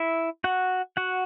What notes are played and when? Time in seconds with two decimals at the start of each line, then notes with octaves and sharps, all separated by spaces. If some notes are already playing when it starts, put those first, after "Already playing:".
Already playing: E4 E5
0.44 F#4 F#5
0.97 F#4 F#5